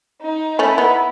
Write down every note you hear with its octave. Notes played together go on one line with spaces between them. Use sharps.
D#4
A3 C#4 E4
B3 D#4